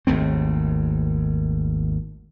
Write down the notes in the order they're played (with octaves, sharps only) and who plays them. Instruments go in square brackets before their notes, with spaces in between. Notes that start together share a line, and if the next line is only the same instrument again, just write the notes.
[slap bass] G#1 D#2 A3 C4